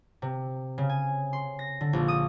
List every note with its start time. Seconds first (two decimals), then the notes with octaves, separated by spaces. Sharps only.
0.22 C3
0.78 C#3
0.89 G#5
1.33 C6
1.59 A#6
1.81 D3
1.93 A#1
2.08 D#6